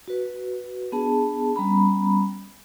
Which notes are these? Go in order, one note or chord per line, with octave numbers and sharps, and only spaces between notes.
F#4 B4
B3 D4 G#4 A5
G3 B3 C#4 A#5 B5